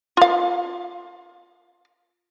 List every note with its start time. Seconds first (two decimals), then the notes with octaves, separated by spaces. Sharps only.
0.17 F4 F5